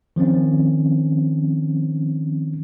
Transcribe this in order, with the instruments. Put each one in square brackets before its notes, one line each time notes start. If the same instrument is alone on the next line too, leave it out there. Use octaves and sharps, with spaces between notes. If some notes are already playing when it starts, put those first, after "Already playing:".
[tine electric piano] D#3 F3 C4 C#4